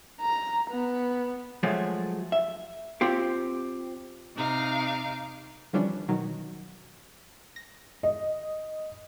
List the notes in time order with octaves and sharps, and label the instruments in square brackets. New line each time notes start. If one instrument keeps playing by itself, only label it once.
[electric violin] A#5
B3
[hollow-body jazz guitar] F3 F#3 G#3 A3 G#4
E5
C4 F4 G4
[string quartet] C3 D#4 F5 D6
[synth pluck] D3 E3 F3 G3 C#4 D4
B2 D#3 F#3
A#6
[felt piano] D#5